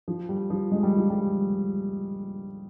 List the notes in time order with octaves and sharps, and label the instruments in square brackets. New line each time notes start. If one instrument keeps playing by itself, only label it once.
[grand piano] F3
G3
F3
G#3
G3
F3
G3